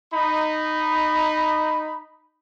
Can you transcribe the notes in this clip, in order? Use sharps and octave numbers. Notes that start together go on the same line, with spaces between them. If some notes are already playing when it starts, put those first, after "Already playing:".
D#4 B5